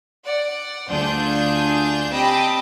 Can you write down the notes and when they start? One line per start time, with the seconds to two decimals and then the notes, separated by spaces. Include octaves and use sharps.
0.25 D5 F#5
0.89 D2 D4 F4 G#4 G6
2.11 C4 G4 D#5 G5 A5 B5